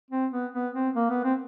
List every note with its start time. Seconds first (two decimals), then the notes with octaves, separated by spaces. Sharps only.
0.11 C4
0.32 B3
0.54 B3
0.74 C4
0.96 A#3
1.10 B3
1.24 C4